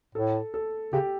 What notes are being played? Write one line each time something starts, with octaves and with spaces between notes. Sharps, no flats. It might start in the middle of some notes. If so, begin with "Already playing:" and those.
A2 A4
A4
C#3 G4